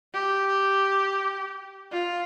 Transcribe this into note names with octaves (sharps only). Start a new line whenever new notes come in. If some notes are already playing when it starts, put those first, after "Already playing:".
G4
F4